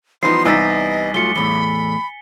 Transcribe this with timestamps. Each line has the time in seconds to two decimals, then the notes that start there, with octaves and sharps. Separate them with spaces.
0.23 E3 F3 G3 B3 D#4 C6 C7
0.45 C2 D#4 D#5 G#5 E6 A6 B6
1.14 F#3 A3 F4 C#7 G7
1.36 E2 A2 B5 G7